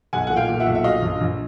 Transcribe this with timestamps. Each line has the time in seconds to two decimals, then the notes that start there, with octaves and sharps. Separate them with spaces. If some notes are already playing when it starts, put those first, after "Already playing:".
0.13 B1 F#5 G#5
0.27 A#2 F#5
0.36 F5 G5
0.49 A#2
0.60 E5 F#5
0.66 B1
0.75 E5
0.84 F#3 D#5 F5
1.02 A#1
1.21 A#1